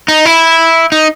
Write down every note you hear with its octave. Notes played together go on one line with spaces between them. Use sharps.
D#4
E4
D#4